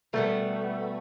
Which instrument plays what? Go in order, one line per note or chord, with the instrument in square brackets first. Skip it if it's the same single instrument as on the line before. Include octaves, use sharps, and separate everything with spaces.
[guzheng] B2 G3 B3 [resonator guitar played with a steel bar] A3